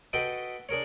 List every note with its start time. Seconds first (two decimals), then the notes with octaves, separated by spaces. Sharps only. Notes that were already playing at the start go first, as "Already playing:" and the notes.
0.13 F#4 A4 B4 D#5 G5
0.69 D4 G#4 A#4 C#5